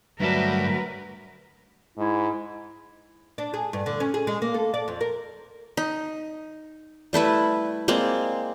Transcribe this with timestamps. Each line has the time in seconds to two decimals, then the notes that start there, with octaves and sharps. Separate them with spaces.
0.20 D2 G2 F#3 A#4 B4 D5 E5 A5
1.97 G#2 E4
3.38 D4
3.54 G#4
3.73 G2
3.86 D3
4.00 C#4
4.14 G#4
4.27 G#3
4.42 A#3
4.54 A4
4.74 D5
4.88 F2
5.01 A#4
5.77 D#4
7.13 G3 A3 E4 B4
7.88 G#3 A#3 C4 D5